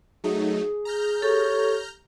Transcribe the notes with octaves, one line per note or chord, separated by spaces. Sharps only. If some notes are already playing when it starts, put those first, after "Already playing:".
F#3 A3 D#4 G#4
A#5 F6 G6
G4 A4 C#5